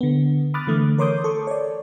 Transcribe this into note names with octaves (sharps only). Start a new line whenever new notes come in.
D3 B3
B5 D6 D#6 F6 F#6 A6
D3 E3 A3
A#4 C#5 C6 D6 D#6 G6
A4 C#6
C#5 D5